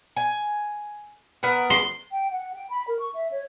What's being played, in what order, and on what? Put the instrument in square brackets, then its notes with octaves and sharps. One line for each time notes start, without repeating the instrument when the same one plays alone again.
[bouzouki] G#5
B3 A#4 F#5
[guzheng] C6
[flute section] G5
F#5
G5
B5
A#4
C#6
E5
C#5